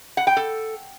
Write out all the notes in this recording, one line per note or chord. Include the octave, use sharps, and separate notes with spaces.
F#5
G5
A4